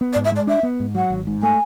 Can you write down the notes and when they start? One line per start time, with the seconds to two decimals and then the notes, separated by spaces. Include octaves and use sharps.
0.01 B3
0.13 D5
0.16 G#2
0.24 E5
0.32 G#3 D5
0.47 D4 E5
0.63 B3
0.80 G#2
0.95 F#3 F#5
1.10 G#1
1.27 G#2
1.42 A3 G#5